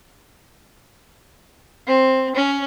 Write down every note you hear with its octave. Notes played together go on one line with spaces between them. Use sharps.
C4
C#4